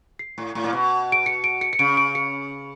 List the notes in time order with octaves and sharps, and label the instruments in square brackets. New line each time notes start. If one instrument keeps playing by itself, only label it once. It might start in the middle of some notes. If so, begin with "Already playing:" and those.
[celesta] C7
[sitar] A2
A2
A#2
B2
[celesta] D7
C#7
D7
C#7
C#7
[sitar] C#3 [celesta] D7
[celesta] D7
C#7